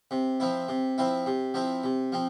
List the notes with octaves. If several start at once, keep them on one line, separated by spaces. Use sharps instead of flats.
C3
F3 C4 E4
C3
F3 C4 E4
C3
F3 C4 E4
C3
F3 C4